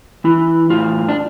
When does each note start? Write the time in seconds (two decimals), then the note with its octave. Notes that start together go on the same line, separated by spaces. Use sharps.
0.24 E3 E4
0.70 A2 F4
1.09 D4